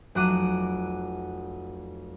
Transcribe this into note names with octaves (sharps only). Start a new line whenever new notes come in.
F1 F#3 F#5 D6 D#7